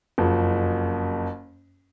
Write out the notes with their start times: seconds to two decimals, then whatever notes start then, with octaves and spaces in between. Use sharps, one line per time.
0.18 F#1 F2